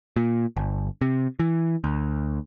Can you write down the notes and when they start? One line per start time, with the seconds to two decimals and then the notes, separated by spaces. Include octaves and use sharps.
0.16 A#2
0.57 G1
1.01 C3
1.39 E3
1.84 D2